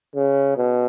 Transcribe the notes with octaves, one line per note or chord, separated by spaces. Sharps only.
C#3
B2